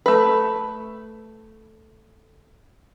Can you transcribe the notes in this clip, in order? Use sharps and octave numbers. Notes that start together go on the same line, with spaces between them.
A3 B4